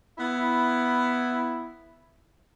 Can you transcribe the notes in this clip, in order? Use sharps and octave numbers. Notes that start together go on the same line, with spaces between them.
B3 E4